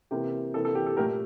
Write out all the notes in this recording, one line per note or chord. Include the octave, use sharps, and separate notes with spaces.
C3 E3 A#3 G4
C3 E3 A#3 A4
A4
G4
A4
A#2 A3 G4 A#4